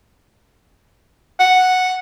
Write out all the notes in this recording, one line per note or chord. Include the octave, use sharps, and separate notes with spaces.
F#5